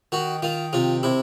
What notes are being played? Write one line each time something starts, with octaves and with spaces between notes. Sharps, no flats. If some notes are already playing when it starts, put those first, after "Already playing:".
D#3 F#4
D#3 F4
C3 F4
C3 E4